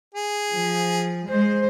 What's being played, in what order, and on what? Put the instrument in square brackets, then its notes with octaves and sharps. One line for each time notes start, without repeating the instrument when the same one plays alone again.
[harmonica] G#4
[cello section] F3
G#3 C5